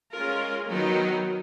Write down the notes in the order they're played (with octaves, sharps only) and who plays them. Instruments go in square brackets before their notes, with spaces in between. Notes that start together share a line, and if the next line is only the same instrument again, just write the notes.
[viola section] G#3 C#4 F4 A#4
D#3 F#3 B3 D#4